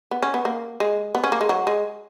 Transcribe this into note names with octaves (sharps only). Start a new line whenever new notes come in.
B3
C#4
B3
A#3
G#3
B3
C#4
A#3
G#3
F#3
G#3